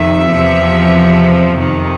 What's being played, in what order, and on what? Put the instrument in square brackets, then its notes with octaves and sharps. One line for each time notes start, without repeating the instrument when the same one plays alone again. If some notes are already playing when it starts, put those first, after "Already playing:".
Already playing: [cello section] F2 C3 D#3 E5
E2 C3 F3
F2 C3 D#3